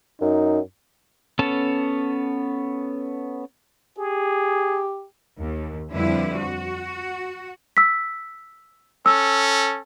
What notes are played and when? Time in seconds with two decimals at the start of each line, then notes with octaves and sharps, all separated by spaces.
0.21 F#2 D#4
1.39 B3 C#4 A4 A5
3.99 G4 G#4
5.39 D#2
5.92 F2 D3 F3 G3 E4 B4
6.39 F#4
7.77 E6 B6
9.06 C#4 A4 E6